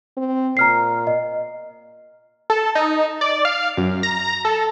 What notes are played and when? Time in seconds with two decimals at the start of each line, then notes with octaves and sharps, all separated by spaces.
0.17 C4
0.57 A#2 A#5 F6 C7
1.07 D#5
2.50 A4
2.75 D#4
3.21 D5
3.45 F5
3.77 F#2
4.03 A#5
4.45 A4